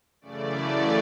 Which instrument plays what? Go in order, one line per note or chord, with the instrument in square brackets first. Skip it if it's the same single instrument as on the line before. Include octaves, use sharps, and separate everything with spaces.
[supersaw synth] F#2 C#3 E3 A3 D5